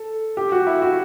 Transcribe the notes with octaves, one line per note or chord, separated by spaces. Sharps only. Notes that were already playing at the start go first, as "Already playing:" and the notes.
Already playing: A4
G4
F#4
E4
F#4